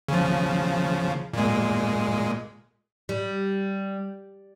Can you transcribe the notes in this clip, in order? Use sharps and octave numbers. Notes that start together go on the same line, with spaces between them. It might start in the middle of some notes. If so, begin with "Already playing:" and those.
C#3 F3
A#2 G#3
G3